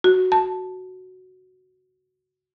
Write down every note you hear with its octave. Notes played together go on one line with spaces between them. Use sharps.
F#4
A5